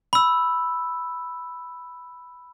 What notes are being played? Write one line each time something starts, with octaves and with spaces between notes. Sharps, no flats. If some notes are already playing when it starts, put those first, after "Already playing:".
B5 E6